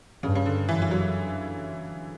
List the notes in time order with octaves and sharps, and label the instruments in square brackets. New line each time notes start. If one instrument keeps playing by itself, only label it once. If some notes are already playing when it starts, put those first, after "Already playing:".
[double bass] G2 [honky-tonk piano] C#3
[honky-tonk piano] C#3
D3
[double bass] F#2 [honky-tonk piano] E3
[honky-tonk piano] E3
F#3